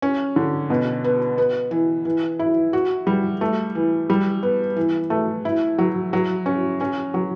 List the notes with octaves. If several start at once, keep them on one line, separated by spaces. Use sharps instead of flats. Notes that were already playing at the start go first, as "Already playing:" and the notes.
C#4
D3
B2
B3
B3
E3
E3
E4
F#4
G3
A3
E3
G3
B3
E3
A3
E4
F#3
F#3
C#4
C#4
F#3